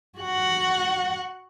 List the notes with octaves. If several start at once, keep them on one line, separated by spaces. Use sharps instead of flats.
F#4 F#5